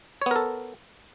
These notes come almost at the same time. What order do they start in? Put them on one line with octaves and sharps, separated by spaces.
C#5 B3 A#4 A4